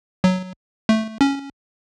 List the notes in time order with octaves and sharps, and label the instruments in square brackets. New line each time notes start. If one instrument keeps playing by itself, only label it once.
[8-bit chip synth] F#3
A3
C#4